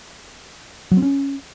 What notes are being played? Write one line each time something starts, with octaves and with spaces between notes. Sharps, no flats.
F#3
C4
C#4